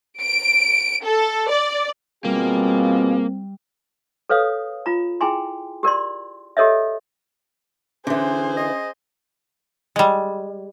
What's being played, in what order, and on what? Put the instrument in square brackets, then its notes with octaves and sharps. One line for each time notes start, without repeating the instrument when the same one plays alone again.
[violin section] D7
A4
D5
[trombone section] B2 F4 G#4 [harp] G3 [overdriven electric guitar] A#3 [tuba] C4
[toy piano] A4 B4 C#5 F5 D#6
F4 A#5
E4 G#4 G5 G#5 A#5 C6
G4 A#4 D5 C6
G4 A4 A#4 C#5 D#5 E5
[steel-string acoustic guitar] D3 E3 [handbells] C#4 [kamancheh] G#4 C5
[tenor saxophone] D#5
[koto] G3 G#3